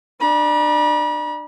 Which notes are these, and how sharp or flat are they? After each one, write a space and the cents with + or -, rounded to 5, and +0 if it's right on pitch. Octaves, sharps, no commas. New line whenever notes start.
D4 +30 B5 -45